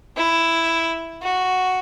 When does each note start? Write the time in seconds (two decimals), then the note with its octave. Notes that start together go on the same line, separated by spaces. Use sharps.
0.17 E4
1.22 F#4